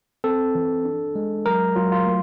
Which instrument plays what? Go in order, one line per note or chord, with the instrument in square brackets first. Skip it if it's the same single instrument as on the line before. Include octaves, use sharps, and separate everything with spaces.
[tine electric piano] C4 A4
E3
D4
G#3
F#3 A#4
F#3 F4
F4
A3